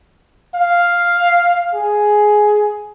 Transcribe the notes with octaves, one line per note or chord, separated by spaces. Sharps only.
F5
G#4